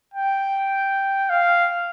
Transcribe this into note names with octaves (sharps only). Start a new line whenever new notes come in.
G5
F5